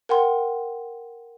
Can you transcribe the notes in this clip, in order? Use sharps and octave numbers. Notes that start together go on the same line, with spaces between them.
A#4 F#5 G5 C6